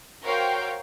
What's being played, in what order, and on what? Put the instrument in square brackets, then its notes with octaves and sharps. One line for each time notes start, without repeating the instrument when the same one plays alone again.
[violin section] F#4 A#4 C5 C#5 F5 G5